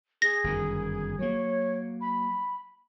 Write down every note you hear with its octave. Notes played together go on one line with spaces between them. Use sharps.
G#4 A#6
G1 F#2 D#3
F#3 A#3 C#5
B5